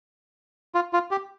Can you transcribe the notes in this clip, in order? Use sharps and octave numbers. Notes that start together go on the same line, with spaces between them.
F4
F4
G4